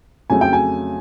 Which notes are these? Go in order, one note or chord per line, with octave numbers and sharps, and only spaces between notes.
F2 C#3 F#3 A3 G#5
G5
G#5